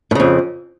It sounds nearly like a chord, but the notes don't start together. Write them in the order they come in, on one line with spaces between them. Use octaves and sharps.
A2 C#3 F2